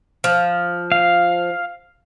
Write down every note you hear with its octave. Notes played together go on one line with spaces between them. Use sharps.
F3
F5